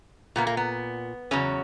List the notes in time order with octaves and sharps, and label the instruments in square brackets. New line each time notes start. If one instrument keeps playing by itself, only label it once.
[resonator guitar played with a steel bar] A#2 A#3 B3
A#3
B3
E2 C#3 F#3 C#4